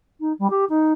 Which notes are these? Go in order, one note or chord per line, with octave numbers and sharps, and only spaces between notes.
D#4
G3
G4
D#4